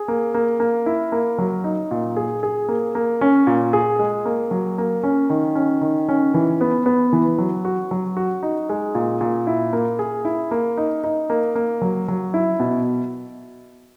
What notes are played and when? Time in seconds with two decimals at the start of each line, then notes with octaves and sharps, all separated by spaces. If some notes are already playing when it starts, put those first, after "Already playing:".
Already playing: G#4
0.08 A#3
0.34 A#3
0.60 A#3
0.86 E4
1.12 A#3
1.38 F#3
1.64 D#4
1.91 A#2
2.17 G#4
2.43 G#4
2.68 A#3
2.95 A#3
3.21 C#4
3.47 A#2
3.73 G#4
3.99 G#3
4.25 A#3
4.51 F#3
4.78 A#3
5.03 C#4
5.30 D#3
5.55 C#4
5.81 D#3
6.09 C#4
6.34 E3
6.61 B3
6.86 B3
7.13 E3
7.38 F#3
7.65 F#4
7.91 F#3
8.17 F#4
8.43 D#4
8.69 G#3
8.95 A#2
9.21 A#2
9.47 E4
9.73 A#3
9.99 G#4
10.25 E4
10.51 A#3
10.77 D#4
11.04 D#4
11.30 A#3
11.55 A#3
11.82 F#3
12.08 F#3
12.34 E4
12.60 B2